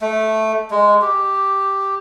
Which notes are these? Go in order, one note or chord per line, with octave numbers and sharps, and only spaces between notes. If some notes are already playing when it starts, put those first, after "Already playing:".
A3
G#3
G4